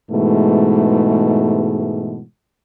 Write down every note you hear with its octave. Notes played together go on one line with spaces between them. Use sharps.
G#2 B2 E3 G#3 A3